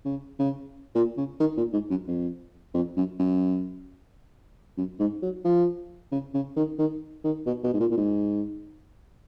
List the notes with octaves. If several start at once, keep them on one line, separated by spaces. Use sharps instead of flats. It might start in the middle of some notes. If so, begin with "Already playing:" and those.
C#3
C#3
A#2
C#3
D#3
A#2
G#2
F#2
F2
F2
F#2
F#2
F#2
G#2
F#3
F3
C#3
C#3
D#3
D#3
D#3
B2
B2
G#2
A#2
A#2
G#2